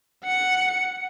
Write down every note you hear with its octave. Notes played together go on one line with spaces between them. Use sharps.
F#5 C#7